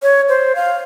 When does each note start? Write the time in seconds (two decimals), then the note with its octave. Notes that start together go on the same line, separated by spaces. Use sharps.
0.03 C#5
0.29 C5
0.56 F5